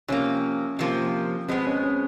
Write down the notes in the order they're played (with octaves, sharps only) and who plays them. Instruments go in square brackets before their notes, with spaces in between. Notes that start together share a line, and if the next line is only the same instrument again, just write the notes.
[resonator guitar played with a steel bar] C3 F3 A#3 [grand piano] C#4
[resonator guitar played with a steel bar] C3 F3 A#3
[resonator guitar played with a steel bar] B2 G#3 B3 [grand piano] C4
[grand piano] C#4
C#4